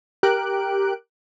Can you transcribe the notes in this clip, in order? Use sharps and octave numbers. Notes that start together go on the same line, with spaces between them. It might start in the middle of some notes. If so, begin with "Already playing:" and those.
G4 A#4 F#6 D7